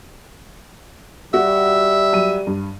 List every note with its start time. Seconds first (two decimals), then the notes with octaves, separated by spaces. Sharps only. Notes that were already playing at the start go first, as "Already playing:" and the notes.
1.34 G3 F#4 E5
2.13 F#3 D#7
2.47 G2